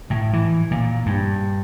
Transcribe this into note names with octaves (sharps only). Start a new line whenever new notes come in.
A2
E3
A#2
G2